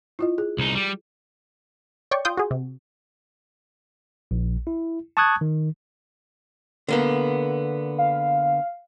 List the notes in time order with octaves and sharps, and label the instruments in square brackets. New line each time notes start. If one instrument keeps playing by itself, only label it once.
[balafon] E4 F4 D#5
G#4
[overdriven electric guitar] C2 D#4
G3
[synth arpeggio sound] C#5 D5 G5 C#6
F4 G5 C6 D#6 G6
F#4 G#4
C3
[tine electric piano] A#1
E4
A5 C#6 D#6 F#6 G#6
D#3
[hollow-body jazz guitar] D3 A#3 B3
[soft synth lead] F5